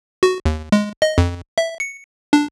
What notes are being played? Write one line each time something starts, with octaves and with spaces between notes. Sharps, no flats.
F#4
D#2
G#3
D#5
F2
E5
C#7
D4